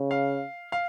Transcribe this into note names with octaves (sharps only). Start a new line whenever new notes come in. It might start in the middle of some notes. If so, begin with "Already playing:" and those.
Already playing: C#3
F5
F5